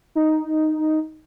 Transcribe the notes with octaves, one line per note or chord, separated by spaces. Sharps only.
D#4